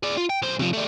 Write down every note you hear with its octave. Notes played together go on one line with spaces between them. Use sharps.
G#4 D5
F4
G5
B1 C5
C3 F3
G3 A3